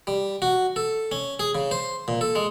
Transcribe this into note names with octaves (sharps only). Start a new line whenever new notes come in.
G3
F#4
A4
C#4
G#4
C#3
C5
A#2
A4
G#3